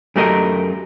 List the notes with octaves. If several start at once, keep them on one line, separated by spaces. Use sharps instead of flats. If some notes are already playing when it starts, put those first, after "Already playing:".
F#2 A3 G4 A#4 D#5